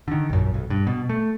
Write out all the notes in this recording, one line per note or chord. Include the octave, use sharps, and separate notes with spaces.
D3 D#3
A#1 F#2
B1
G2
B2
A3